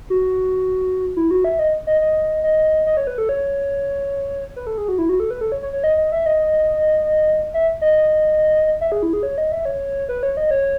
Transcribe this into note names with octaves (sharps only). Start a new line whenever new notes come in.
F#4
E4
F#4
E5
D#5
D#5
D#5
D#5
D#5
C#5
B4
A4
C#5
B4
A4
G#4
F#4
E4
F#4
A4
B4
A4
C#5
C#5
C#5
D#5
D#5
E5
D#5
E5
D#5
E5
G#4
E4
G#4
C#5
D#5
E5
C#5
B4
C#5
D#5
C#5